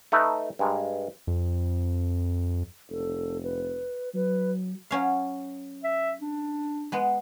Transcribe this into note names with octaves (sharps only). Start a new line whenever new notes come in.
A3 D#4 B4 E5
G2 G#3 A#4
F2
F1 A4
B4
F#3 B4
F#3 C#4 F5
E5
D4
G#3 B3